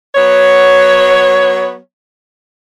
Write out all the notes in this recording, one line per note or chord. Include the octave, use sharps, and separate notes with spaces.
F#3 B3 C#5